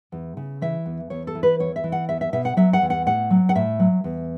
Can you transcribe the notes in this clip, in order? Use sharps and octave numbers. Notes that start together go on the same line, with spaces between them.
E2
C#3
E3 E5
E2
E2 C#5
A4
E3
B4
E2 C#5
E5
E3
F#5
E2 E5
E5
B2 E5
F#5
F#3 E5
F#5
E2
F#5
A2 F#5
F#3
F#5
A2 E5
F#3
E2